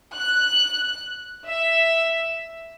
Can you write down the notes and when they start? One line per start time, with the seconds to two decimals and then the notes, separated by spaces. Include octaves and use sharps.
0.16 F#6
1.47 E5